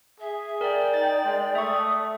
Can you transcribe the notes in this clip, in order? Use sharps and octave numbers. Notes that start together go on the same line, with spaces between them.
G#4 E5
A#4 D5 G5
D#4 A6
G#3
A3 E5 C#6 D#6